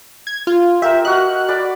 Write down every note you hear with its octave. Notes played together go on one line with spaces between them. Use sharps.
G#6
F4
G4 A#4 E5
F#4 D#5 F#6
D5 B5 D6